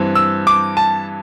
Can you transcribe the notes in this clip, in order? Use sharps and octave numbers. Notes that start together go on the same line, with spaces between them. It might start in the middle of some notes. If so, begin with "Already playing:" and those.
Already playing: G2 E3 C4
E6
D6
A5